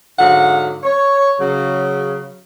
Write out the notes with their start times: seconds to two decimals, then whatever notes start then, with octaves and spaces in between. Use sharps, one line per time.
0.19 G#2 D3 F#3 F5 F#5
0.84 C#5
1.40 C#3 F#3